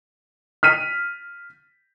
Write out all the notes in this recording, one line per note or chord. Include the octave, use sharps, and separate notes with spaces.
F6 B6 D#7